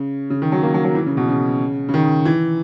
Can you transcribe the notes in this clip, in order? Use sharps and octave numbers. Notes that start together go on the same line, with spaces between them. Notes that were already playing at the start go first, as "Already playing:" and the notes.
Already playing: C#3
C#3
D#3
F#3
A#3
F#3
F#3
E3
C#3
B2
C#3
C#3
D#3
E3